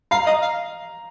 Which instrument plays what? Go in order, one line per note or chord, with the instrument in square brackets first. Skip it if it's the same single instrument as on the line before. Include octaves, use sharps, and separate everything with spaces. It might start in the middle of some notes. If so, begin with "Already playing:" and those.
[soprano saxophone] F5 [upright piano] A#5
[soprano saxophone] D#5
F5